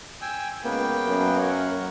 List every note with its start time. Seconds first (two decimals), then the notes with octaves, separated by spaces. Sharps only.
0.22 G5 G#5 E6
0.64 C#2 A#3 B3 G5
1.06 F#2
1.38 A#4 C#5 F#5